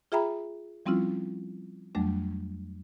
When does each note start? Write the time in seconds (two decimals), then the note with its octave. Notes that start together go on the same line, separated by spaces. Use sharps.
0.12 F4 G#4 E5 G5 A#5 B5
0.86 F3 G3 C4 C#4 E4 F4
1.95 F2 F#3 G3 A3 D4